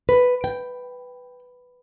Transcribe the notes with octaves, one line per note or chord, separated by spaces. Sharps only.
B4
G5